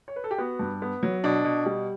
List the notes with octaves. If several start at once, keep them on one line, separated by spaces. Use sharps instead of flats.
C#5
B4
A4
G4
B3 F#4
G2
B3
F#3
B2 D4
B2
G3